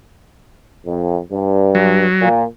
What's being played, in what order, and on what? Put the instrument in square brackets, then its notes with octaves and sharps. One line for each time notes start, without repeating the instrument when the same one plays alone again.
[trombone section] F2
G2
[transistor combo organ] F#3
[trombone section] A#2